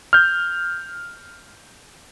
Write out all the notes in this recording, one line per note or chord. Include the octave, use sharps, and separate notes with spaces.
F6 G6